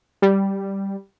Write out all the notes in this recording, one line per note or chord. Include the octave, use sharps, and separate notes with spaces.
G3